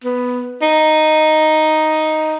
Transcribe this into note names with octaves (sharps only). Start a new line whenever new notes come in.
B3
D#4